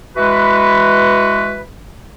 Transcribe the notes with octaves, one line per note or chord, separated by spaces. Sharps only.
E3 G#3 F#4 B4